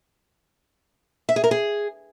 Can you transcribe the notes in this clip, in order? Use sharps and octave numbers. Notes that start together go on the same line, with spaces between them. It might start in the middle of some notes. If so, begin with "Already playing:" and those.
E5
G#4
A#4
G#4